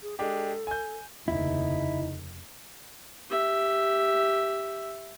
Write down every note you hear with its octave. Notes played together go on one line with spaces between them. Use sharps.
G#4
G#3 D4 G4 A4
G#5 G6
F1 D#2 C#3 D#4 E4
G4 E5